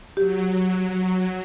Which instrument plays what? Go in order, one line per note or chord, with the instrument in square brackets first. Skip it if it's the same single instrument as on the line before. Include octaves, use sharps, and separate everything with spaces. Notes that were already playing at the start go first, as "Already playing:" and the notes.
[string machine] F#3 [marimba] G4